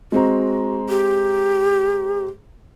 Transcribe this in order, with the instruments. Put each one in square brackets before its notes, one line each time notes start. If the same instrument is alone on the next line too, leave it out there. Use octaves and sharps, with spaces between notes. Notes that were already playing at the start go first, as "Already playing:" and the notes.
[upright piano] G#3 C4 A#5 [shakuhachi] F#4
[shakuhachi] G4